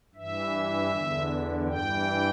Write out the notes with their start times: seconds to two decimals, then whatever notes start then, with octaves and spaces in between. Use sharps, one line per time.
0.15 G2 E3 E5
0.91 E2 D3
1.68 G2 E3 G5